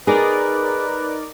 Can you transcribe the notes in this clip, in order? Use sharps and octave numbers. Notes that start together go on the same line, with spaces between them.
D#4 G#4 A#4 B4 D5